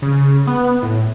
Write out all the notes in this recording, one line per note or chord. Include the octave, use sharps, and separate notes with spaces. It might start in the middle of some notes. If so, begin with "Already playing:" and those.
C#3
B3
A2